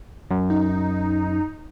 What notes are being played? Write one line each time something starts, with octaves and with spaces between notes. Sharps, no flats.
F#2
D#4